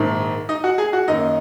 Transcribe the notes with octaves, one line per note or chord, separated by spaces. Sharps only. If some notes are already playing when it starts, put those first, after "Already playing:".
Already playing: A#1 G#2 D#3
D#4 D#5
F#4 F#5
G#4 G#5
F#4 F#5
F#2 D#3 A#3 D#4 D#5